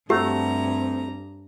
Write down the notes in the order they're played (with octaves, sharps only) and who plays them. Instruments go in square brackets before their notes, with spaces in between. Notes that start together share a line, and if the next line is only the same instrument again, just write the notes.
[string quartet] G2 A#5 [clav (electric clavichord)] A3 F#4 [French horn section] C4 [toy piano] G4